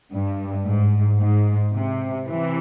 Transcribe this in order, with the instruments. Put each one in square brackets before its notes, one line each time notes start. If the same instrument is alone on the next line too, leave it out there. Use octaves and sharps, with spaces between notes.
[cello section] G2
G#2
G#2
C3
C3 E3